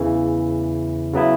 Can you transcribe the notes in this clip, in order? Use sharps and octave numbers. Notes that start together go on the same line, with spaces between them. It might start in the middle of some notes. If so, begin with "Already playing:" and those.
Already playing: E2 C#3 E3
C#3 F#3 B3 E4